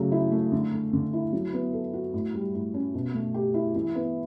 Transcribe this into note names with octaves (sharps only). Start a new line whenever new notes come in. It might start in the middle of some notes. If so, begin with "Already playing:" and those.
Already playing: C#3 F#3 A3
E4
A3
D3
A3
D3
E4
F#3
B3
A4
F#4
A2
G3
A2
C#4
B2
A3
G4
E4
E3
B3